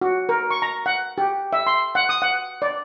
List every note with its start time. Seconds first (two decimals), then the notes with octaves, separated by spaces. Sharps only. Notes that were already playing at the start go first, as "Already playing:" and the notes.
0.01 F#4
0.29 A#4
0.51 C#6
0.62 A#5
0.86 F#5
1.18 G4
1.53 E5
1.67 C6
1.95 F#5
2.09 D#6
2.22 F#5
2.62 D5